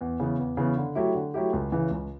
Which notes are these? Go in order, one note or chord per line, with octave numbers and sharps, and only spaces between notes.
E2
C#3 E3 B3
E2
C#3 E3 B3
D3
F#3 A3 E4 G4
D3
F#3 A3 E4 G4
C#2
C#3 E3
C#2